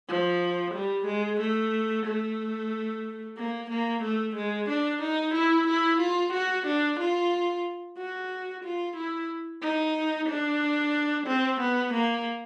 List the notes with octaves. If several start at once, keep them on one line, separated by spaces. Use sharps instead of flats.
F3
G3
G#3
A3
A3
A#3
A#3
A3
G#3
D4
D#4
E4
E4
F4
F#4
D4
F4
F#4
F4
E4
D#4
D4
C4
B3
A#3